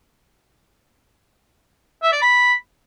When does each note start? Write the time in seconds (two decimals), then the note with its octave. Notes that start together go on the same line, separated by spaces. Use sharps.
2.03 E5
2.13 D5
2.22 B5